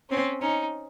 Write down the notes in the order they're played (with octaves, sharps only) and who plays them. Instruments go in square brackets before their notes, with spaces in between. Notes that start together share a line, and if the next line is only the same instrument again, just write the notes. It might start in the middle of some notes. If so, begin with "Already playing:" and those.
[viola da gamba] C4 [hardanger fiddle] C#4
[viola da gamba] C#4 [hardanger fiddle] D#4